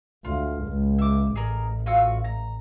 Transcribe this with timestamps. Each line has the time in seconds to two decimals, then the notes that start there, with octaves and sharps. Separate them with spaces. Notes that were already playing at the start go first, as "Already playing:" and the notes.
0.25 D2 F4
0.65 C#2
0.98 E5 D6
1.36 A1 G#4 A#4
1.86 F4 F#4 E6
2.24 A#5